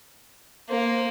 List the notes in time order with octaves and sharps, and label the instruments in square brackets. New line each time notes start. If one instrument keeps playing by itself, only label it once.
[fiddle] A#3 [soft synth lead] C5